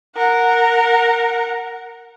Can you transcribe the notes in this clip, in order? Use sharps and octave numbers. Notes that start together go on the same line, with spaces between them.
A#4 F#5